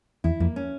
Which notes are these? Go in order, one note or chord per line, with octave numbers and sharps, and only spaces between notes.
E2 E4
F2 A#3
C#4